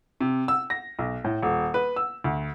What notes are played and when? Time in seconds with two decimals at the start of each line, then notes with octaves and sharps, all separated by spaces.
0.21 C3
0.48 E6
0.70 A#6
0.99 B1
1.24 A2
1.42 D#1
1.74 B4
1.96 E6
2.24 D2